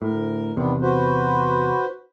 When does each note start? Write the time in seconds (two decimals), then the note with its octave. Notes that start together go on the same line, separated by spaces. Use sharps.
0.02 D2 A2 A#4
0.57 E2 C3 D#3 B3 D4
0.82 F#4 B4 C5